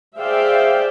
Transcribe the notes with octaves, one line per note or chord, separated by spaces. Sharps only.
G#4 C5 D5 E5 F5 G5